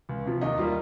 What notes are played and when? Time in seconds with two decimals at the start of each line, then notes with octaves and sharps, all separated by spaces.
0.09 C#2
0.26 C3 F3
0.41 D#2 D#4
0.58 D#3 G3 A#3 F4